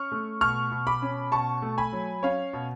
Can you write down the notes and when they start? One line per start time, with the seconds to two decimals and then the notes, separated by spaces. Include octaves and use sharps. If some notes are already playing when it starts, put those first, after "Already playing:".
Already playing: C#4 C#6 F6
0.12 A3
0.41 B2 C#6 F6
0.72 B2
0.87 B5 D6
1.02 C#4
1.32 B2 A5 C#6
1.62 A3
1.78 G#5 B5
1.92 F#3
2.23 C#4 C#5 F5
2.53 B2